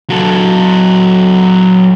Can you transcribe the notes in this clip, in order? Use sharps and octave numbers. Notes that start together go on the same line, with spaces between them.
F#3 A4